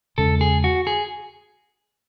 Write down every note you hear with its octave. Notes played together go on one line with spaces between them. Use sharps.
E2 C#3 G#3 C#4 A4
G#4
F#4
G#4